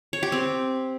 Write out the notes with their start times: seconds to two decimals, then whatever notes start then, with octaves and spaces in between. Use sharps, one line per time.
0.13 C#5
0.23 G4
0.32 C4